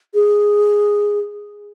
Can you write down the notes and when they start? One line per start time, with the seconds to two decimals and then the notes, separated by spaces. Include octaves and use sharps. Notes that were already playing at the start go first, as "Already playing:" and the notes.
0.14 G#4